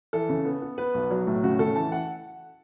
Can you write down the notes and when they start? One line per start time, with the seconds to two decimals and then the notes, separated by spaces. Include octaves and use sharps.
0.13 E3 A4
0.29 C#3
0.45 B3
0.62 B3
0.78 B3 B4
0.94 B1
1.11 F#3
1.27 A2
1.43 C#3 F#4
1.59 C#3 A4
1.76 E3 A5
1.92 F#5